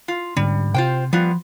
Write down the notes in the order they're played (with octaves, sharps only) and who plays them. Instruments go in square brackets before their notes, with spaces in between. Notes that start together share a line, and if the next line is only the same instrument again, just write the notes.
[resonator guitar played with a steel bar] F4
[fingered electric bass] G#2 D3 C#4 [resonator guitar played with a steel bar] G3
[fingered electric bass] C3 [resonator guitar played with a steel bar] F4 C5 G5
[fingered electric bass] F3 [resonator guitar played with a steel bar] G3 B3 F4